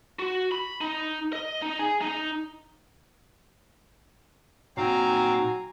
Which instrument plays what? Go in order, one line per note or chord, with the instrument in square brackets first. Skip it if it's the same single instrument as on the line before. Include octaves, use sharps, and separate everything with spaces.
[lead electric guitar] F#4
B5
D#4
D#5
D#4
G#4
D#4
[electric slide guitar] A#2 D#4 G5 [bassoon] F#3 [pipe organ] C4 F5 [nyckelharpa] G#5 A#5